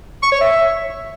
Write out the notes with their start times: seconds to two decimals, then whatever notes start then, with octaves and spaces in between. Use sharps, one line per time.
0.23 C#6
0.32 C#5
0.41 E5